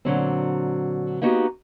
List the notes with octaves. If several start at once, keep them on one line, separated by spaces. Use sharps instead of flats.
A#2 D3 F#3 C4
A#3 B3 D#4 F#4 G4